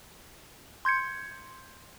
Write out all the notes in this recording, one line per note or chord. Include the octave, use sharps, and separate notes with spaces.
C6 G6 G#6 C#7